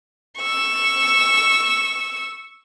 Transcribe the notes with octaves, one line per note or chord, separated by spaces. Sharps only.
C#6 E6